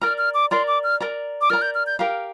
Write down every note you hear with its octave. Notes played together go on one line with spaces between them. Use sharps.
A#4 D5 A#5 F6
F6
D6
A#4 D5 A#5 C6
D6
F6
A#4 D5 A#5
D6
A#4 D5 A#5 F6
G6
F6
G6
G4 A#4 F5 A#5